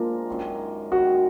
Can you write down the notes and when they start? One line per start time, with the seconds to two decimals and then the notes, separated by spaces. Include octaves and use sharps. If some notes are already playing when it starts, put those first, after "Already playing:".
Already playing: A#2 F3 G#3 A#3 D4 F4 A#4
0.28 F#2 D#3 G#3
0.92 F#2 D#3 G#3 F#4